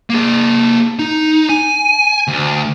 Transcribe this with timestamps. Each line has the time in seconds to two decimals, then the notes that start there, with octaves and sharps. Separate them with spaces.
0.10 A#3 G#4
0.99 D#4
1.49 G#5
2.28 D2